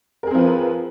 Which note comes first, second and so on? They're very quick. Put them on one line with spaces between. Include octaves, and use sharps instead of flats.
A#4 G#4 C4 F3 B4